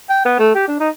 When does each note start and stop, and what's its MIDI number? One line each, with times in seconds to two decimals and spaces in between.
0.09 0.22 79
0.25 0.39 59
0.39 0.54 57
0.55 0.65 67
0.67 0.76 62
0.80 0.89 63